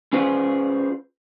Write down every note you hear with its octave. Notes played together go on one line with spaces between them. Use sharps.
C#4 F4 G#4 B4 C5